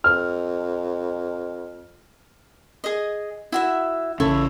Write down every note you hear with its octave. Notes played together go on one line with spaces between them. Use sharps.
F2 F6
G#4 D#5
E4 F#4 E5
A1 C#3 C#4 E4 A4 C#6